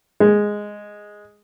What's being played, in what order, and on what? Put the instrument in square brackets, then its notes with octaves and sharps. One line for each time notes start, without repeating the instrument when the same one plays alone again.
[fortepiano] G#3